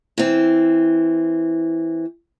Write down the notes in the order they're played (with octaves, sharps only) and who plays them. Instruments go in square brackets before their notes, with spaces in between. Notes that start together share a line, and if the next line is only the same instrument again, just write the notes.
[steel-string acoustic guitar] E3 C4